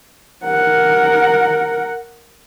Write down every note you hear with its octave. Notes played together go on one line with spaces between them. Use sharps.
A#4 F#5